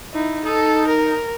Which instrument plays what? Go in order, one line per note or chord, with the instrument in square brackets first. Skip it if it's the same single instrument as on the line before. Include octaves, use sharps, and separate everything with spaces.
[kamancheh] D#4 E4
[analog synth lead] D#4 [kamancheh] A4
[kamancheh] A#4